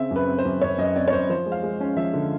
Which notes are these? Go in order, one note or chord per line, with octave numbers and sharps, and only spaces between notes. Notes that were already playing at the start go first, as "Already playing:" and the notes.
Already playing: C#3 C4 E5
F#2 B4
C4
C5
F#2
F#2 C#5
F#2 D#5
C4 D5
C#5
F#2 C5
F3 C5
G#3
F5
G#3
C#4
F3 E5
D3